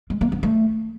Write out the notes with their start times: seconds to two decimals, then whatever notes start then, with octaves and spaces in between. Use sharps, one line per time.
0.10 G#3
0.21 A#3
0.32 B3
0.43 A3